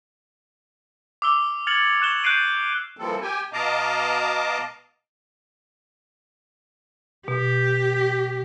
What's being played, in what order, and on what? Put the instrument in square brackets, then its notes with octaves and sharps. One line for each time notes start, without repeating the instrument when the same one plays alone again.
[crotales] D6 E6 G7
F6 G#6 A6 C#7 F7 F#7
C#6 F#6 E7 G7
F#6 G6 A6 C7 D7 D#7
[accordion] E3 F3 G3 A#3 C4 A4
G4 G5 G#5
B2 D#5 F5 A5 A#5 D6
[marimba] B2 [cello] G4